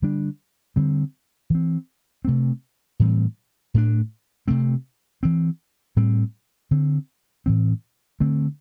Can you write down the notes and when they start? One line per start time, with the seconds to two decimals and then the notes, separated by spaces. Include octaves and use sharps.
0.02 D3 G3 D4
0.76 D3 G3 C4
1.50 E3 C4
2.25 C3 A3 C4
3.00 A2 E3 G3 C4
3.74 A2 A3 D4
4.48 C3 A3 C4
5.23 E3 C4
5.96 A2 G3 C4
6.71 D3 C4
7.46 A2 E3 C4
8.20 D3 A3 C4